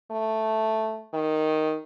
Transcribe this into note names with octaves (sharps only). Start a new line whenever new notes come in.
A3
D#3